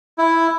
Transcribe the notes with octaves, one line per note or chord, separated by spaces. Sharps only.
E4